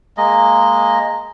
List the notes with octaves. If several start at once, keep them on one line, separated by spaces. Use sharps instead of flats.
G#3 A#3 D#5